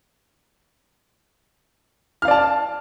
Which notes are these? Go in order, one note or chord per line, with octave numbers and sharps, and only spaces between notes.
D5 F5 A5 F6